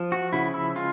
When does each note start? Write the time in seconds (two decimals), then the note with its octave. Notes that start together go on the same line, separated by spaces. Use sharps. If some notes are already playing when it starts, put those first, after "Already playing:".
Already playing: F3
0.12 F#4
0.33 C#3 E4
0.54 E4
0.76 G#3 F4